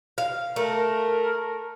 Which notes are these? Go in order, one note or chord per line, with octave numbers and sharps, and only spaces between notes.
F5
A3 A#4